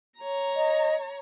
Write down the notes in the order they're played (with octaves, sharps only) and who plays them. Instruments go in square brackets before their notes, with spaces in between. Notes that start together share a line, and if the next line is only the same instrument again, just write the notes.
[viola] C#5 A#5
[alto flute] D#5